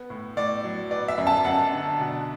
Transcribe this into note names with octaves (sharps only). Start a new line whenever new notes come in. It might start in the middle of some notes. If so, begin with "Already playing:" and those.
Already playing: B3
A2
A2 D5
F#3
B3 D5
E5
F#2
A5
F#2 F#5
D3
B2